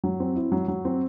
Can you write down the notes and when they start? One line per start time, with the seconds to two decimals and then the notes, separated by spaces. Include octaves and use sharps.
0.04 F#3
0.20 C4
0.36 E4
0.52 F#3
0.68 F#3
0.85 C4